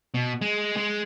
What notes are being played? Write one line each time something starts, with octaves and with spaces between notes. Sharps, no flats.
B2
G#3
G#3